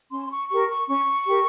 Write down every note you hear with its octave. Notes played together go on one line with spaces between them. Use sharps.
C#4 C6
C6
C#6
G4 A#4 C#6
C#6
C#4 C#6
G4 A#4